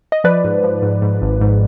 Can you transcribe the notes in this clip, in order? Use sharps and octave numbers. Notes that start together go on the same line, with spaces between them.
D#5
F3 B4 D5
G#2
F3
G#2
G#2
G#1
G#2